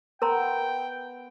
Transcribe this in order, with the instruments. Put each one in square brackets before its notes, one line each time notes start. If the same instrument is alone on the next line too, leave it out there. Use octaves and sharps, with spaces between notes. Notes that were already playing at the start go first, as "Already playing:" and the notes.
[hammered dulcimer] B3 [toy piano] A#4 A#5 C6 [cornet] G5